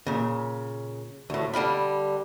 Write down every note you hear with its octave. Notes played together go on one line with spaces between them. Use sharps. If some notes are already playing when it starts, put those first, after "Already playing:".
A#2 C#3
D2 A2
D3 G3 F5 B5